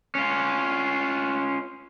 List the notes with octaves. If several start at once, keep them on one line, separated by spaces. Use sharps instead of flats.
C#4 F4